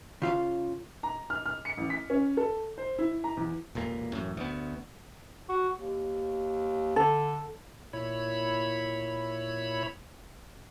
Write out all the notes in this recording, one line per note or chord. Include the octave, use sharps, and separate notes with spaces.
C#3 F4 F5
A#5
F6
F6
C#7
A1
B6
C#4
A4
C5
E4
A#5
E2
E1 A1 A#2 A#3
A1 F#2 A2
D2 B3
F#4
D#2
D3 A4
A#2 E4 C#5 B5